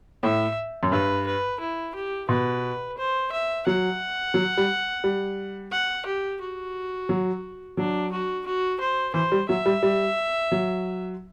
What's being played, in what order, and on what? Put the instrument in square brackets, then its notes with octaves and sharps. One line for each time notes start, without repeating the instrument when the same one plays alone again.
[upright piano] A2 [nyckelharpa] E5
[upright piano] F#2
[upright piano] G2 [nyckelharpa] B4
[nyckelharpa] B4
E4
G4
[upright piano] B2 [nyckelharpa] B4
[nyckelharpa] C5
E5
[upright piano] F#3 [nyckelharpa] F#5
[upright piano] F#3
G3
G3
[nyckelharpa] F#5
G4
F#4
[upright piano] F#3
[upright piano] F#3 [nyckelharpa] D4
[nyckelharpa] F#4
F#4
C5
[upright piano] E3 [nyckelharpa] C5
[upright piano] G3
[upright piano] F#3 [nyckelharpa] E5
[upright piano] G3
G3
F#3